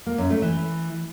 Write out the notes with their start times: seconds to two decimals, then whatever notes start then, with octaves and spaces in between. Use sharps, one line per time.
0.06 A#3
0.18 F#2
0.30 A3
0.42 E3